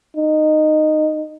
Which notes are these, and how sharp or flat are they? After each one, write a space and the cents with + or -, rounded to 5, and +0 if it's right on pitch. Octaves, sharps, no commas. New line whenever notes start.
D#4 -15